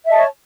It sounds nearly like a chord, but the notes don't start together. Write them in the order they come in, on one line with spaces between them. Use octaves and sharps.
E5 D#5 A5 C#5